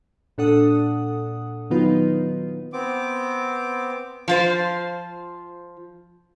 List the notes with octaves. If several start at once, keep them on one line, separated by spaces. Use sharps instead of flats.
A#2 D4 A4 F#5 D#6
D#3 F#3 B3 D#4 F4 B4
B3 C4 D6
F3 F4 C5